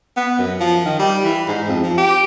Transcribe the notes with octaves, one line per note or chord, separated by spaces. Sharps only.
B3
F#2
F3
D#3
G3
E3
G#2
F2
F3
G4